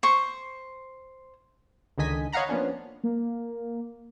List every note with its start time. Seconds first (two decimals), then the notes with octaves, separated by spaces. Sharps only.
0.03 C5 C#6
1.98 C#2 D3 D#3 D#5 G#5 B6
2.32 C#5 D#5 F5 F#5 A#5 B5
2.49 F3 A#3 B3 C#4 D4
3.04 A#3